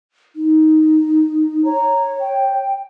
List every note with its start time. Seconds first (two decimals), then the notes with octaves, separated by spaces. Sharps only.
0.36 D#4
1.64 C#5 A#5
2.20 G5